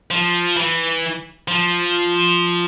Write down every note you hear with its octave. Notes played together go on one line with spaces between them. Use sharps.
F3
E3
F3